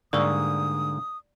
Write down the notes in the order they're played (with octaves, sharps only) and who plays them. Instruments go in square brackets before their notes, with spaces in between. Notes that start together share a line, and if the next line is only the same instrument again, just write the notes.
[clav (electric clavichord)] G#2 G3 A#3 [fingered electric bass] D3 [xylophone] D5 C#6 E6 [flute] D#6